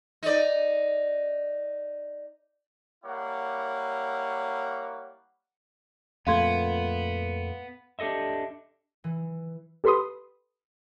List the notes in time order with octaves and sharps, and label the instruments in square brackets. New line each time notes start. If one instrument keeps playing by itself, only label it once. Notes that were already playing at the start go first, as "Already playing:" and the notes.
[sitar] D#4 D5
[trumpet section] G3 A#3 E4 C#5 F#5
[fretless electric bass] F2 A#2 A3 [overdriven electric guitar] B3 [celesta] F5 C6 G#6
[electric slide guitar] D4 G4 A4 D#5 E5
[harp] E3
[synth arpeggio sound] G4 A4 B4 B5 C6 D#6